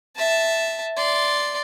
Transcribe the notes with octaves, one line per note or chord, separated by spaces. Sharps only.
E5 A5
D5 C6